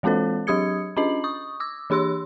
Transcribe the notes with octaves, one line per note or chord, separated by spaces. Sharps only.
E3 G#3 C4 F4 A4 C5
F#3 D4 G4 D#6 G#6 C#7
C#4 D4 F4 D#5 F#7
C#6 D#6
D6 E6
E3 D4 G4 C6 E6